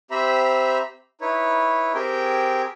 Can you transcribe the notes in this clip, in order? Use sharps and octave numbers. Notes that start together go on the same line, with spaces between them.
C4 G4 C5 E5 A#5 B5
D#4 E4 B4 C#5
C4 G4 G#4 A#4 G5